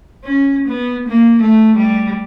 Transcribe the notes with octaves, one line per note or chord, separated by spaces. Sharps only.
C#4
B3
A#3
A3
G3